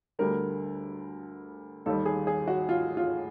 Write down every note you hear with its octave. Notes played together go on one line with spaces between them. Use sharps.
D2 D3 G3 A#4
D#2 D#3 G3 A4
G#4
G#4
F#4
F4
F4